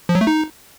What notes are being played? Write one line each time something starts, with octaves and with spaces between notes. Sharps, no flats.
F3
F#3
A3
D#4